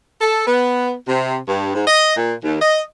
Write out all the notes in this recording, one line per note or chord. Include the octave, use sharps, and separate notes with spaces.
A4
B3
C3
G2
G#2
D#5
A#2
D#2
D#5